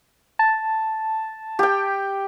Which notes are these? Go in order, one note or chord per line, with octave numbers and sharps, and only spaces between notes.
A5
G4 G5